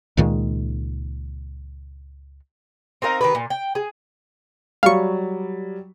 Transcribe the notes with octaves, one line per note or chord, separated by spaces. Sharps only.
C#2 A#2 D#3 G#3
C4 D#4 A#4 F5
D#3 G4 B4
A#2
G5
G#4
F#3 G3 F5 C#6